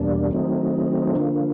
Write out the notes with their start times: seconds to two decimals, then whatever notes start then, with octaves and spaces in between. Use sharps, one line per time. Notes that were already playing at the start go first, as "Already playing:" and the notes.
Already playing: E2 B2 G3 A#3 D4
0.31 D#3 F#3 A3 C4 D#4
1.15 D3 F3 A#3